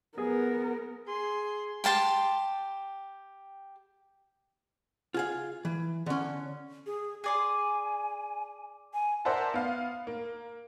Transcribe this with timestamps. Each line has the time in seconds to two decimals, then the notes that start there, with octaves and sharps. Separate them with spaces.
0.18 B3 G#4 A#4
1.07 G#4 C6
1.84 G4 G5 A5 C6
5.14 F4 G#4 F5
5.65 E3
6.06 D3 C#4
6.86 G#4
7.24 G#4 D5 G#5 C6
8.94 G#5
9.25 A#4 C5 D5 E5 F#5 A5
9.54 B3 F5
10.07 A#3